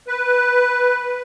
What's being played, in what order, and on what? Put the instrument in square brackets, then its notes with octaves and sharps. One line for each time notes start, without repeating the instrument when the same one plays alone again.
[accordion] B4